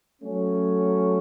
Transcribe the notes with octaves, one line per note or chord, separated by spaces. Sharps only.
F#3 A3 C#4